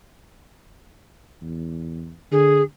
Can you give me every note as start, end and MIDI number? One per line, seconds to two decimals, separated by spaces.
1.41 2.14 40
2.31 2.61 50
2.31 2.62 68